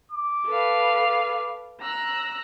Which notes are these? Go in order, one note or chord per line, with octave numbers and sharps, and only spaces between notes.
D6
A4 B4 F5
A#5 E6 F#6